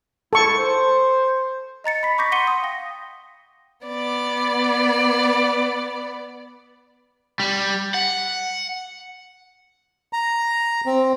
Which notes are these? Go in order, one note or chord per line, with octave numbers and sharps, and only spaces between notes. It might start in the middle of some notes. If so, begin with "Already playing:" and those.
G#2 G#3 E4 A4 C#6
C5
D#5 A#5 A6 C#7
B5 B6
A#5 C#6 D6 G6 A#6 B6
F#5 C6 B6 C#7 D#7 G7
D#6
F5 G5 A#6
B3 D5
G3
F#5
A#5
C4